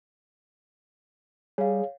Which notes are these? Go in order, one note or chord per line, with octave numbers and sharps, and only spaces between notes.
G3 G#4 C#5 F5